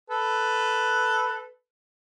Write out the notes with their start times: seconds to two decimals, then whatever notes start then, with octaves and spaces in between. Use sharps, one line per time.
0.10 A4 B4